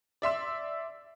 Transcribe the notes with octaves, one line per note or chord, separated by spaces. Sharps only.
D5 E5 C6 E6